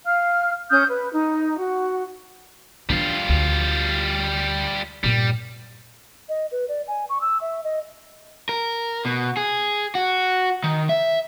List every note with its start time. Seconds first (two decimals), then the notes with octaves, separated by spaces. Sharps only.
0.06 F5 F6
0.70 C#4 D#6 F6 G6
0.88 B4
1.12 D#4
1.58 F#4
2.89 E3 G3 D4 F4
3.29 D2
5.04 G2 A#2 G3
6.29 D#5
6.52 B4
6.69 D5
6.88 G#5
7.09 C#6
7.21 E6
7.41 E5
7.64 D#5
8.49 A#4
9.05 B2
9.37 G#4
9.95 F#4
10.64 D#3
10.89 E5